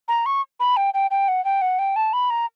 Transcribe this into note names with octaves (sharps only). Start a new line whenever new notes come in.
A#5
C#6
B5
G5
G5
G5
F#5
G5
F#5
G5
A5
B5
A#5